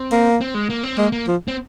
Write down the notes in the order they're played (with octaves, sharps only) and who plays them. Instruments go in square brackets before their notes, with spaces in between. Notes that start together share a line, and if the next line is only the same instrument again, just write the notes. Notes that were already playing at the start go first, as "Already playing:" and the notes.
Already playing: [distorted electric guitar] C4
[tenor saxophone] A#3
[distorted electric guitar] C4
G#3
A#3
C4
[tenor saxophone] G#3 [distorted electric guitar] A#3
[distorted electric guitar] A#3
[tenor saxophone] F3
[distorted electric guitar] C4